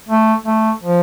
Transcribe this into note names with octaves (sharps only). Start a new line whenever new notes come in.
A3
A3
F3